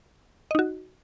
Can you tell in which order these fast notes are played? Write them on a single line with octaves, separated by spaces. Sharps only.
D#5 D#4 F#4